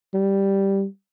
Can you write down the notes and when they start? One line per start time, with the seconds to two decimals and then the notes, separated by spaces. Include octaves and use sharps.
0.14 G3